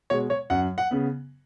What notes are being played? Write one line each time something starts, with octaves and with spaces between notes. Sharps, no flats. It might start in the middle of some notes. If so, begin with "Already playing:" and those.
B2 G#3 C#5
C#5
F#2 F#5
F#5
C#3 B3